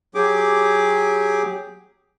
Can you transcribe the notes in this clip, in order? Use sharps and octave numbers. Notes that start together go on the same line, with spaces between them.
F#3 G4 G#4 D6